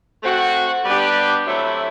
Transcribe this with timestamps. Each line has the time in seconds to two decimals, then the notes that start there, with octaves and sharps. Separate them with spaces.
0.23 A3 C4 F#4
0.85 G3 B3 D4 G4
1.46 C3 F#3 A3 E4